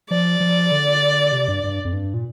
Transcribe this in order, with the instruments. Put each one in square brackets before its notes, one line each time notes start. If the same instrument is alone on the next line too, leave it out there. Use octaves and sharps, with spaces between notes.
[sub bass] F3 [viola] D5
[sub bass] F3
D3
C3
G2
G2
F2
G2
A#2